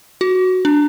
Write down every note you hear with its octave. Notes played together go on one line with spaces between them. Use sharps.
F#4
D4